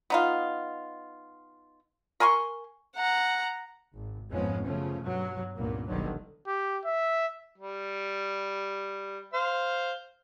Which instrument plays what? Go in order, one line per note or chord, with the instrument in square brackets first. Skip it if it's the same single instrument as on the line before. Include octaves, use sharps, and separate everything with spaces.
[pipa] B3 D#4 F4
A#4 G#5 C6 C#6
[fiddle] F#5 A#5
[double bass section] G#1
F2 G#2 F3 G#3 B3 C#4
F#2 C#3 F3 A3 C#4
G2 B2 F#3
C#2 G2 A#2 A#3 B3
G1 C2 B2 D3 D#3 F#3
[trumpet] G4
E5
[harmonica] G3
C5 F5